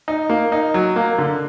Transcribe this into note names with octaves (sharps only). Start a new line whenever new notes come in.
D#4
A#3
D#4
F#3
A#3
D3